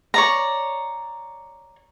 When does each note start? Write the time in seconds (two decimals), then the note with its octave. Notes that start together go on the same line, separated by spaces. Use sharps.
0.14 C#5 D5 A#5